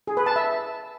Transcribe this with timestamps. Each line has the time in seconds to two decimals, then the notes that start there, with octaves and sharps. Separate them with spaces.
0.07 G#4
0.17 B4
0.26 A5
0.36 E5